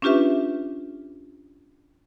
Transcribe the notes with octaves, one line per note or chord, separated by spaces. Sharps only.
C#4 D4 F4 G4 B4 E5